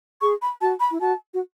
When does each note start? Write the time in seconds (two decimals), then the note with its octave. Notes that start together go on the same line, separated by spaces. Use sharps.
0.21 G#4 C#6
0.42 B5
0.61 F#4 A5
0.80 B5
0.91 E4
1.01 F#4 A5
1.34 F#4